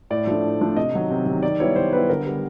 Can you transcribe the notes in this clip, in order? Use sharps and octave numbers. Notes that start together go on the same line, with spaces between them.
A2 D5
F3 A3 D4
A2
F3 A3 D4
C3 D#5
D#3 F#3
C3
F#3
D#3
D#3 D5
G3 B3 E4 C#5
D#3 C5
G3 B3 E4 B4
D3 A#4
G3 B3